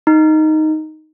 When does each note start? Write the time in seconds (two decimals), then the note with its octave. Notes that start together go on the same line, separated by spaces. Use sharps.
0.07 D#4